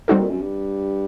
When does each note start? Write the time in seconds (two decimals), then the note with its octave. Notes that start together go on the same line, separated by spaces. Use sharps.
0.08 G3 C4 D#4 F#4 A4
0.19 A#2
0.31 F#2
0.41 G2